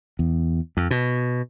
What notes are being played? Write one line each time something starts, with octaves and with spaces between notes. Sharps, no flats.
E2
F2
B2